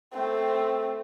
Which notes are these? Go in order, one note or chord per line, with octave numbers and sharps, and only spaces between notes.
A3 C4